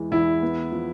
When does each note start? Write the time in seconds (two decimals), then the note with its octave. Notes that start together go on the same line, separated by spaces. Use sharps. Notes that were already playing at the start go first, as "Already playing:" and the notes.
Already playing: E2 E3 G#3
0.11 E2 E4
0.42 B3
0.72 F3